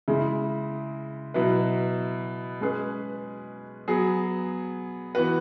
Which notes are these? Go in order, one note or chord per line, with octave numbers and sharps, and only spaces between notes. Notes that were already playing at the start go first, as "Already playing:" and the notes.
C#3 G#3 E4
B2 F#3 E4 B4
G#3 C#4 G#4 B4
F#3 B3 G#4
E3 B3 F#4 B4